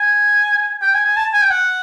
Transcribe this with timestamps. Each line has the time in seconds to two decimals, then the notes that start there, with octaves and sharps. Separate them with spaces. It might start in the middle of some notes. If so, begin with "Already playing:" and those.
Already playing: G#5
0.82 G5
0.94 G#5
1.06 G#5
1.17 A5
1.33 G#5
1.42 G5
1.50 F#5